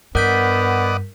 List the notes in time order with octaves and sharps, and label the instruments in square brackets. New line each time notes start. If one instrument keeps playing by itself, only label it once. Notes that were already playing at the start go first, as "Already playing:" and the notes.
[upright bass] G2 [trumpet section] B3 [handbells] A#4 G6 B6 [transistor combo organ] D5 D#5 F#5